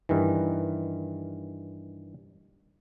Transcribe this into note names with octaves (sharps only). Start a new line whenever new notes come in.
G2 D#3 E3